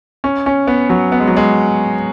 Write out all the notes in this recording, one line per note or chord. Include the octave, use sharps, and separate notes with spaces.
C#4
C#4
B3
F#3
B3
G#3
F#3
G#3